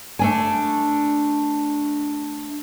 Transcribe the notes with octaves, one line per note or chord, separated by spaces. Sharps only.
A3 D4 G#5